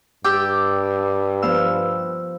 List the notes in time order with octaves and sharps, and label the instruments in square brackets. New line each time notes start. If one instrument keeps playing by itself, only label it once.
[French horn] G2 [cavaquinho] G4 D5 G5 [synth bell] D6 E6
[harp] F3 B3 F5 [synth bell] E6